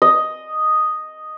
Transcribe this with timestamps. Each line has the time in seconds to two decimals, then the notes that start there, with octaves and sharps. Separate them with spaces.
0.02 D#5